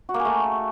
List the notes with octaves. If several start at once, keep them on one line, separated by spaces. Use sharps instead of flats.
F#4
A#3
G#4
A3